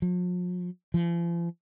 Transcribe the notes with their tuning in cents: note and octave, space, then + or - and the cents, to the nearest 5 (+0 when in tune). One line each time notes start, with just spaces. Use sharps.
F3 +45
F3 -40